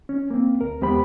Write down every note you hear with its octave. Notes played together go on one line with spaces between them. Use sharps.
C#4
A#3 C4
D2 A#4
E2 G#3 B3 G4 C5 B5